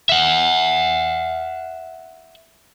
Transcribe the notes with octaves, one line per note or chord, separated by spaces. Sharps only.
E5 F#5